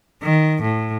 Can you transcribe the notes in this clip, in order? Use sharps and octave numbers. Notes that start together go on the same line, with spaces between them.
D#3
A2